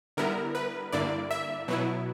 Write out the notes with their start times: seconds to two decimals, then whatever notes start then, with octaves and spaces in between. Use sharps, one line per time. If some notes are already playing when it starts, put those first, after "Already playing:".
0.17 D3 G3 B3 E4 A#4
0.55 B4
0.92 G2 D3 A#3 E4 D5
1.31 E5
1.68 B2 F#3 B3 E4